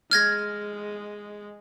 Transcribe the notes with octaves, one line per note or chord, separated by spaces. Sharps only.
G#3 F6 G#6 A#6